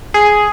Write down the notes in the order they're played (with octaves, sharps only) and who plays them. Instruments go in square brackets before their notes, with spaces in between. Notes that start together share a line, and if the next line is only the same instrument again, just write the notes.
[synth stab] G#4